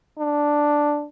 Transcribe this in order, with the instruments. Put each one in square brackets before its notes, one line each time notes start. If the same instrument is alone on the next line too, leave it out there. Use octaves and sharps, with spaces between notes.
[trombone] D4